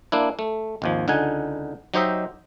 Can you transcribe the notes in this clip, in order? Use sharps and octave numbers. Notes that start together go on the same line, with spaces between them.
A#3 D4 E4
A3
G#1 D#2 F3
C#2 D3 D#4 F#5 G#5
F#3 D#4 G4 C5 D#5 E5